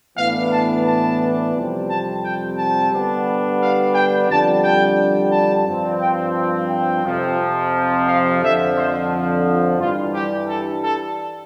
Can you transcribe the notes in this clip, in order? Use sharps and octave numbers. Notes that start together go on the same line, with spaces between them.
A2 E3 B3 D4 F5
A5
A5
F2 C3 G3 C4
A5
G5
A5
D3 G3 B3 D4
F5
G5
F2 D3 G3 D4 A5
G5
A5
G2 F3 C4
G5
G5
F2 C3 F3
F5
F2 D3 F3 E5
C5
G2 E3 G3 D4 F4
G4
A4
A4